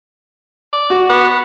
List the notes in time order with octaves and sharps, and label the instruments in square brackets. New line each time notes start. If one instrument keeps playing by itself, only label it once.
[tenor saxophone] D5
[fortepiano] F#4
[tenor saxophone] B3